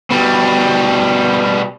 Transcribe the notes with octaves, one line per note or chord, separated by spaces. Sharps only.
B2 G3